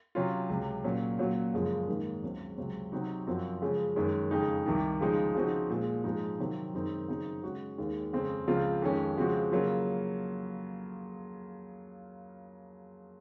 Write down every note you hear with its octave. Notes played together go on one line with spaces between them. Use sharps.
C3 F#3 C#4 F4
C#2 C3 F#3
A#2 F#3 C#4
A#2 F#3 C#4 F#4
F#2 C#3 F3 G#3
G#2 D#3 A#3 D#4
C#2 C#3 F#3 C4
C#2 C3 F#3 C4
C3 F#3 C4 D#4 F#4
F#2 F3 C4 F#4
C#3 F3 G#3 C#4
F#2 D#3 G#3 C#4
F2 C#3 G#3 D#4
C2 C3 D#3
C#3 F3 G#3 D#4
C#3 F3 C4 D#4 F#4
A#2 F3 G#3
G#2 F3 G#3 D#4
C3 D#3 F#3 C4
F#2 D#3 G#3 C4 D#4
C#3 F#3 C4 D#4
C#3 G#3 C#4 F#4
D#2 D#3 G#3
F2 C#3 G#3 C4
C#2 C#3 F3 C4 F4
F2 D#3 G#3 C#4
C#3 F3 G#3 C4 F#4
C#3 F#3 A#3 F4